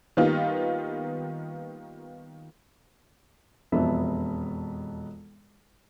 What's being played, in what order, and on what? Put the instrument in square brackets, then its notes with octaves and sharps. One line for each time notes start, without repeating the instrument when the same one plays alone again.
[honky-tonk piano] D#3 G3 A#3 B3 D#4 F4
[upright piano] E1 F2 B3 E5